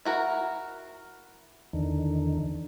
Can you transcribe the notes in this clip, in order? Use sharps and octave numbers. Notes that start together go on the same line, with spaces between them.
E4 F#4 A#4
E2 D3 D#3